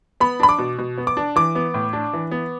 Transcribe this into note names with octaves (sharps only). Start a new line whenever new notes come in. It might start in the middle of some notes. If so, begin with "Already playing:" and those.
B3 B5
D4 B5
D6
B2
B2
B3
D6
D4
E3 D6
B3
A2
D4
E3
B3